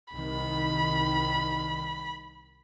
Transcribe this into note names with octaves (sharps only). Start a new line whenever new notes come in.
C2 D#3 B5